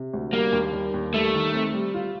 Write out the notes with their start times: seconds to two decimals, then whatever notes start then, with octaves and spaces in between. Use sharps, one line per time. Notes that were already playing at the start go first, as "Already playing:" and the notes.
Already playing: C3
0.14 D2
0.33 G3 A#3
0.53 D#2
0.73 G3
0.94 D#2
1.14 G3 A3
1.34 D#3
1.54 C4
1.74 G3
1.94 F4